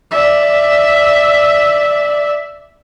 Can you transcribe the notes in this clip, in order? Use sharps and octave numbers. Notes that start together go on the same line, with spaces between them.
D5 E5